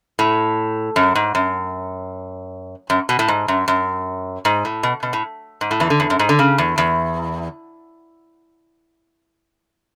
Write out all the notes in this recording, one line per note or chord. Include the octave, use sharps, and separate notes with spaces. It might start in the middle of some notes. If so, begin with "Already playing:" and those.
A2
F#2
G#2
F#2
F#2
B2
A2
G#2
F#2
F#2
G#2
A2
B2
B2
A2
G#2
A2
E2 E3
D3
E2
F#2
G#2
D3
C#3
E2
E2